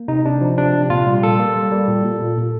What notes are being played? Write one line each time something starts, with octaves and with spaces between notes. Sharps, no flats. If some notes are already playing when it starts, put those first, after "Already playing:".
Already playing: A#3
C3 D#4
C3 D4
F3
C3 D4
C3
A#2 F4
G3
A#3 A4
A#3
G3
G3
A#2
A#2
A#2
A#2